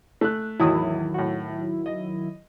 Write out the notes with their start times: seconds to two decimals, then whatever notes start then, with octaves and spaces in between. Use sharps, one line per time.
0.21 A3 F#6
0.60 E2 A2 D#3 F#3 E4 D#6
1.14 A2 F#4
1.86 D#5